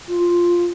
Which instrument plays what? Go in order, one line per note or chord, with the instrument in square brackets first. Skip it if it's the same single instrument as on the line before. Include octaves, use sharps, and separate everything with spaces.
[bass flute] F4